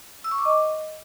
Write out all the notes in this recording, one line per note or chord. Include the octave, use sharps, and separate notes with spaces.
E6
C#6
D6
D#5